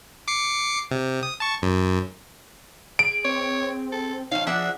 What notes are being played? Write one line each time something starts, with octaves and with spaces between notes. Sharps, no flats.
D6 C7 C#7
C3
D#6
A5 C#6
F#2
G#4 D7
C4 C#5
A4
F3 C#4 D#4 F5
F3 D4 G#4 E5 F#5